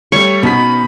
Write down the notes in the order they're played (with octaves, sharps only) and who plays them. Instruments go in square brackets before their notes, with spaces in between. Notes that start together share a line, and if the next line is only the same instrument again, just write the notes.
[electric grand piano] G3 A3 C#5 [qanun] C#6
[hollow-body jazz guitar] B2 [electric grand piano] C#4 D#4 B6 [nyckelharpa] B5